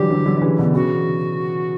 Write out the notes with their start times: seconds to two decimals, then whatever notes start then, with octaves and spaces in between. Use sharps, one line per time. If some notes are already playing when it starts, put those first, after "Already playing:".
Already playing: D3 E3 F#3 G3 G4
0.10 D3 F#3
0.26 D3 F#3
0.37 D3
0.42 C#3 E3
0.59 B2 D3
0.74 C#3 E3 F#4